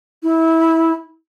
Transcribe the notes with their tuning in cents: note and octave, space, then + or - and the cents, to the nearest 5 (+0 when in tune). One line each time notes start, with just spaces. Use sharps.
E4 -20